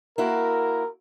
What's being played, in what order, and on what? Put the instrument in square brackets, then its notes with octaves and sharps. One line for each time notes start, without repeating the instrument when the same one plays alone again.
[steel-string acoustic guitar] A#3 E4 F#4 [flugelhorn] A#4